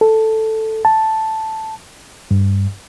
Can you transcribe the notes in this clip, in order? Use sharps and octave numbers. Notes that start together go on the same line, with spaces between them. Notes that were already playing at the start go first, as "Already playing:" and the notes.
A4
A5
G2